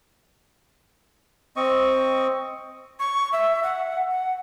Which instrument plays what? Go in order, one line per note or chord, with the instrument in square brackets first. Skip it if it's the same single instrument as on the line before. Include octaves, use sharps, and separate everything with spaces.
[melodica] C4 D#5 C#6
[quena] C#6
E5
F#5
F#5